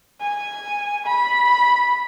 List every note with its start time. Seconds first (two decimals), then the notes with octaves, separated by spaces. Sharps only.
0.20 G#5
1.07 B5